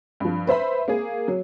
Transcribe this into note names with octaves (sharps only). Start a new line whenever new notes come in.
G2 F3
B4 C5 E5 B5
A#3 G#4
F#3